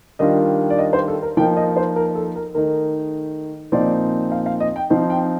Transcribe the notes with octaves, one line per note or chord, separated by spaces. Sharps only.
D#3 G3 D4 F4 D#5
D5
D#5
C5
A4
A#4
F3 A#3 D#4 G5
D#5
C5
A#4
A4
A#4
D#3 A3 D#4 A#4
A#2 F3 C4 D#4 D5
F5
F5
D#5
G5
F3 C4 D#4
G5